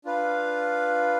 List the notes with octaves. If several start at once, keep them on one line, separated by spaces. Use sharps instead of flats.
D4 F4 B4 F5